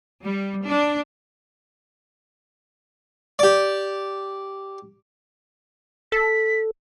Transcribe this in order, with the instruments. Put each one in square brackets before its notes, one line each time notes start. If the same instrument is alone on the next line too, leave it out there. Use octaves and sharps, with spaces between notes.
[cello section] G3
D4
[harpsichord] G4 D5
[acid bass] A4 [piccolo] B6